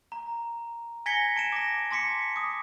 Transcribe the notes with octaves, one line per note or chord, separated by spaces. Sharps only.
A#5
G#5 G#6 A#6 B6 C#7 G7
A5 D7 E7
D6 A#6
A5 C6 D6 B6 C#7
D6 D#6